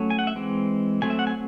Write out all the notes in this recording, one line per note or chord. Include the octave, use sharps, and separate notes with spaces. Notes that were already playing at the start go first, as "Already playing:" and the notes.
Already playing: F#3 A3 C#4
G#5
F#5
E5
E3 G#3 C4
F#3 A3 C4 G#5
E5
F#5
G#5